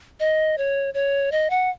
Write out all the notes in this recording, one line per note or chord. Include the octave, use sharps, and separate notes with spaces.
D#5
C#5
C#5
D#5
F#5